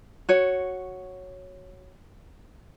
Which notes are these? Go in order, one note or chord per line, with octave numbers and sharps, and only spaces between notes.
F#4 C#5